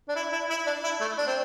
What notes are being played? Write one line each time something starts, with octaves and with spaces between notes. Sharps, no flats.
D4
E4
E4
E4
D4
E4
A3
D4
C4